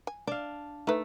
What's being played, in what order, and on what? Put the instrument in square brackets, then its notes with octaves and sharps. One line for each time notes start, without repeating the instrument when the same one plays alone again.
[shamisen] G#5
[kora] D4 F5 [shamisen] D5
[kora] A3 [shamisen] D#4 B4